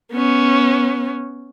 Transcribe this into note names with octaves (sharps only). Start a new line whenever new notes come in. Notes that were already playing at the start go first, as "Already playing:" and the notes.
B3 C#4